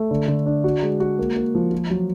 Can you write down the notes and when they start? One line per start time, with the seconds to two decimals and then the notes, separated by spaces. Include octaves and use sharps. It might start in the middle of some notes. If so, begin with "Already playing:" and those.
Already playing: A3
0.11 D3
0.28 D3
0.46 D4
0.64 F#4
0.82 G#3
1.00 F#4
1.19 A#3
1.37 A#3
1.55 F3
1.72 F4
1.90 F#3